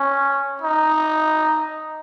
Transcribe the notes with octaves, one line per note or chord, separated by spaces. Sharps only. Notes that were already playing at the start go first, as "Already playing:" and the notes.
Already playing: C#4
D#4